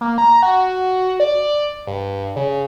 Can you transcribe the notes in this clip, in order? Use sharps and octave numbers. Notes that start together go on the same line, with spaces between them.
A#3
A#5
F#4
D5
G2
C#3